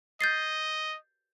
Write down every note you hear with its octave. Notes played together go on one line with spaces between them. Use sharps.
D#5 G6 A6 C7